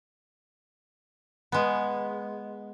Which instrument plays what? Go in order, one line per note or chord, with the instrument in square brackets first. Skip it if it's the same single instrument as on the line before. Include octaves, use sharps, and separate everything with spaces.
[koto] G#3 B3